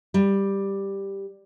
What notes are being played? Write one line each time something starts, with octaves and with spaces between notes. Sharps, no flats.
G3